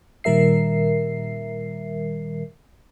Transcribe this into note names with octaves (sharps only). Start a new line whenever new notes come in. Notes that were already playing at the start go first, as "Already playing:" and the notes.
A#2 D#3 G3 A#4 E5 C7